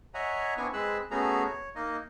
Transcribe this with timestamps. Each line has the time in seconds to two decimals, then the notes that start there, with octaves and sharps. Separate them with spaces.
0.14 C#5 D#5 E5 F#5 G#5 A#5
0.57 B3 C4 D4 E4 G#5 C#6
0.73 G#3 C4 G#4 B4 E6 F#6
1.11 A3 B3 C#4 F#4 G#4 A#5
1.45 C#5
1.75 A#3 D#4 D#5